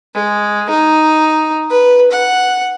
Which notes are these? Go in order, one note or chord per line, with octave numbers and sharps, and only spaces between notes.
G#3
D#4
B4
F#5